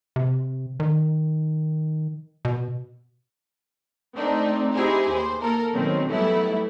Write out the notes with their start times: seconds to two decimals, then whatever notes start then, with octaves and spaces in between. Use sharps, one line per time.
0.16 C3
0.80 D#3
2.45 B2
4.16 A3 C4 D4 D#4
4.74 D#4 E4 G4 G#4 C5
5.10 D#2 C5
5.41 A#3 A4 A#4
5.74 B2 D#3 F#3 C4 C#4
6.09 E3 F#3 G3 A3 B3 E4